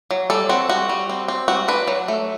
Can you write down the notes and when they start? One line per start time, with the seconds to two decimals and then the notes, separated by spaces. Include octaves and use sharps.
0.11 F#3
0.30 G3 A4
0.49 C4 F#4
0.69 G3 F#4
0.89 G3
1.10 C4
1.28 C4
1.48 G3 F#4
1.68 D4 B4
1.88 F#3
2.08 A3